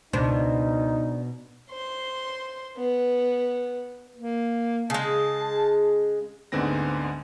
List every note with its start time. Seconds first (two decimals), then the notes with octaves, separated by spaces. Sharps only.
0.13 C#2 B2 D4 D#4 C5
1.70 C5 C6
2.77 B3
4.16 A#3
4.90 C#3 G#3 A5
6.52 D2 G#2 D3 B3 C4 A#6